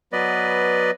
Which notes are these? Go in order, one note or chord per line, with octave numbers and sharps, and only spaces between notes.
F#3 B3 B4 D5 D#5